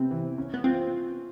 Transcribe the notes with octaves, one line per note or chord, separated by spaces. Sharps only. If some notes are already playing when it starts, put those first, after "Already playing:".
Already playing: C3 B3 C4
E3
C#4
B3
C4 F4